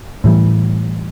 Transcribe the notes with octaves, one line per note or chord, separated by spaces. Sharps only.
A2 E3 G3